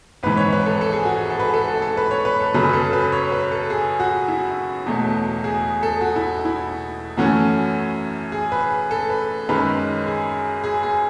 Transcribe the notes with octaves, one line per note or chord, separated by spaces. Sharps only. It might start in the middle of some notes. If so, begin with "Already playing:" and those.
G#1 G#2 E3 B4
C#5
B4
A4
A4
G#4
F#4
G#4
A4
B4
A4
A4
A4
B4
C#5
B4
A4
F#2 C#3 F#3 C#4 B4
A4
B4
C#5
B4
A4
G#4
F#4
E4
E1 E2 B2 A3
G#4
A4
F#4
E4
E4
F#2 E3 A3 C#4 F#4
G#4
B4
A4
B4
F#2 D#3 G#3 C#4 B4
G#4
G#4
G#4